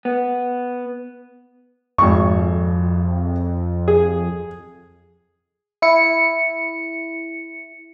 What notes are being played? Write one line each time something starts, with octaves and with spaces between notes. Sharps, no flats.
B3
G#1 F2 C#6
G#4
E4 C#7